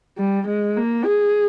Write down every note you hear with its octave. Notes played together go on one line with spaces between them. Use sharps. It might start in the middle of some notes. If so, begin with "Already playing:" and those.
G3
G#3
A#3
G#4